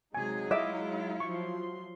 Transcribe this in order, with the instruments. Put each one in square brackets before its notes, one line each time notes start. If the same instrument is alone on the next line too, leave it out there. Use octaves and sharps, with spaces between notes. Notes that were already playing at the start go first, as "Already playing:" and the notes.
[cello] C3 G#4 [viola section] F#3 G#3 D#4 [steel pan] G#5
[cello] E4 F4 [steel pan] D#5 D6 [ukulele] E5
[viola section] F3 F#3 C6 [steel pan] C#6